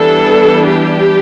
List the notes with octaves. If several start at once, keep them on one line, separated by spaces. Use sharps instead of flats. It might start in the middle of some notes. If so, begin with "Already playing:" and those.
Already playing: E3 G3 B3 D4 A4
G4